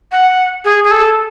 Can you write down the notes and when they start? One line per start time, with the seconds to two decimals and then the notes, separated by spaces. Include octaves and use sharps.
0.12 F#5
0.65 G#4
0.84 G#4
0.91 A4